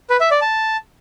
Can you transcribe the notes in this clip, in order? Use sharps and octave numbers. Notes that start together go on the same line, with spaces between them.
B4
E5
D5
A5